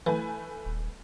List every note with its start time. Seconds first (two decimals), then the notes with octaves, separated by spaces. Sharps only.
0.07 E3 A3 B4 G#5
0.65 D#1